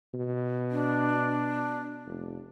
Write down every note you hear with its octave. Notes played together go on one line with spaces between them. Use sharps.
B2
D4
F1